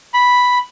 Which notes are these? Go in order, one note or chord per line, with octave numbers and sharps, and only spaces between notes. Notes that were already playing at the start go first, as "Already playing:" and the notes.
B5